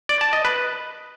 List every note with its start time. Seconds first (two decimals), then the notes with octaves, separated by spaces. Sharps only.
0.09 D5
0.21 A5
0.33 D#5
0.45 B4